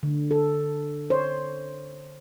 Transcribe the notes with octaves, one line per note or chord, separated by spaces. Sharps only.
D3
A4
C5 C#5